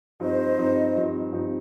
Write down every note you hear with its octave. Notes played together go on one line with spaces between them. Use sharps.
G2 F3 C4 D#4 C5 D#5
G2 F3 C4 D#4
G2 F3 C4 D#4
G2 F3 C4 D#4